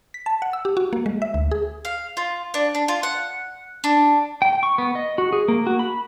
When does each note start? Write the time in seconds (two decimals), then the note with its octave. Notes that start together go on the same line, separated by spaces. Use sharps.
0.14 B6
0.26 A5
0.42 F#5
0.53 E6
0.65 G4
0.77 F#4
0.93 A#3
1.06 G#3
1.22 E5
1.34 D2
1.51 G#4
1.85 F5
2.17 F4
2.54 D4
2.75 D4
2.88 F4
3.03 F#5
3.84 D4
4.42 G5
4.63 C#6
4.78 B3
4.95 D#5
5.18 F#4
5.33 G#4
5.48 A#3
5.67 F#4
5.79 B5